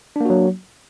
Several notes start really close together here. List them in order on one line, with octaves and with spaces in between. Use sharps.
D4 A#3 F#4 F#3